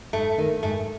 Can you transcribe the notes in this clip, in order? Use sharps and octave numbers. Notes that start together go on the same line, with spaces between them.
G#2 A3
D#3 A3
G#2 A3